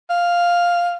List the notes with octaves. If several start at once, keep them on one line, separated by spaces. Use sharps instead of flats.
F5